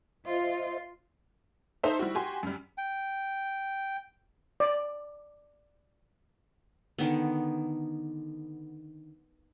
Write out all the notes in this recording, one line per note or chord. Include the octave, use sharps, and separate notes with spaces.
F4 C5 D#5 E5
D#4 A4 C5 E5
G3 E4 F#4
F#4 G4 G#5 C6
F#2 G3
G5
D5
D3 D#3 B3